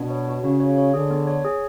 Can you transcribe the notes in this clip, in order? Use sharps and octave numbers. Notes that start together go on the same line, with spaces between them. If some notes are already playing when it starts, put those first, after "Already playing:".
Already playing: B2 D4
C#5
F#4
C#3 F#4
C#5
C#5
D3 G#4
B3
C#5
G#4